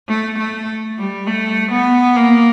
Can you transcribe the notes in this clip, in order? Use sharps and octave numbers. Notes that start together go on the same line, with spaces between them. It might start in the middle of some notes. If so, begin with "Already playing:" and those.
A3
A3
G3
A3
B3
A#3